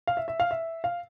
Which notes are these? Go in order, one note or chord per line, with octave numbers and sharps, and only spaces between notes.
F5
E5
E5
F5
E5
F5